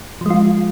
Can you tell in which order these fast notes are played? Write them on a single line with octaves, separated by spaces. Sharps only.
F3 G#3 F4